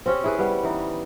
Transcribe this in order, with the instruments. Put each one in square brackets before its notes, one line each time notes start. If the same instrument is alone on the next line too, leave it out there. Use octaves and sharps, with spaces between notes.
[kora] C4 C#4 G4
E4 G#4 B4
G3 B3
E3 D#4